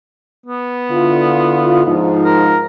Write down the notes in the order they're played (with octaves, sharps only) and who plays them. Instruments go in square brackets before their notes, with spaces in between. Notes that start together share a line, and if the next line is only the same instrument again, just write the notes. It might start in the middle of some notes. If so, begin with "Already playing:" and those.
[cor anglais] B3
[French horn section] D3 E4 F4
G#2 F3 D#4
[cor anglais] A#4